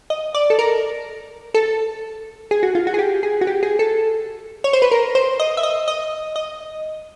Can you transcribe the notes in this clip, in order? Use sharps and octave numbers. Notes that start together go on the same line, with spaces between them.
D#5
D5
A4
A#4
A4
G#4
F#4
F4
F#4
G#4
G4
G#4
F#4
G4
G#4
A4
C#5
C5
B4
A#4
C5
D#5
E5
D#5
D#5
D#5